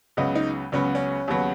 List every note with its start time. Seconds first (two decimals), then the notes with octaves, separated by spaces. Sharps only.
0.17 C#2 C#3 F#3 B3 D#5
0.35 D#4
0.72 C#2 C#3 F#3 B3 C#4
0.95 C#4
1.28 D#2 C#3 F#3 B3